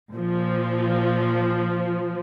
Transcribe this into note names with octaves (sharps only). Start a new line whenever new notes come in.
A#2 F3